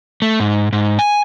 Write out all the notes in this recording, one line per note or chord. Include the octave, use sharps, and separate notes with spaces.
A3
G#2
G#2
G#5